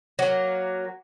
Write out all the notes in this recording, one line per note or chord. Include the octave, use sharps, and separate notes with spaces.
F#3 A#3